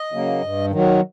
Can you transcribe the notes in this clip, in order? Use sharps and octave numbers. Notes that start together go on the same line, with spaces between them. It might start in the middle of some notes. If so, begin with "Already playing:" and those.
Already playing: D#5
C#3 F#3 A#3
G2
D#3 F#3